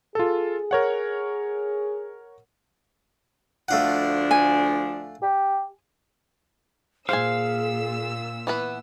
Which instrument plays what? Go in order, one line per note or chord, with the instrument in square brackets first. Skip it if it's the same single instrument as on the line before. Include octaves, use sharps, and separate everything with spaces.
[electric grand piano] F4 A4 [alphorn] G#4
[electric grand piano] A#4 C#5 F#5
[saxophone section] D2 F3 D4 [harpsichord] A3 F5 F#5
[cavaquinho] G#5
[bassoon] G4
[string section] A#2 E6 [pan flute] G#4 [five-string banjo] C5 G#5 [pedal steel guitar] F5
[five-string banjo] E3 B3 B4